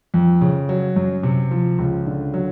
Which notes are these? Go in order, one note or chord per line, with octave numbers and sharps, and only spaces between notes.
F2
C#3
F#3
F#2
C3
F3
C#2
D3
F#3